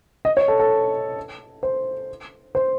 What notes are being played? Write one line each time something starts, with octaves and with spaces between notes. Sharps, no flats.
D#5
C#5
A4
A4
C5
C5